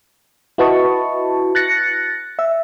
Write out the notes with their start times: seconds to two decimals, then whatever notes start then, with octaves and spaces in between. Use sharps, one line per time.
0.58 E4 F#4 B4 D#5 A5 C#6
1.55 F#6 A6 A#6 C#7
2.39 E5